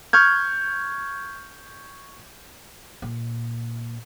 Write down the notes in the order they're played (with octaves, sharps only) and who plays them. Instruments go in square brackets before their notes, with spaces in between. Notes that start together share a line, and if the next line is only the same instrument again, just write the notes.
[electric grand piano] C#6 F6 G6 G#6
[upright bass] A#2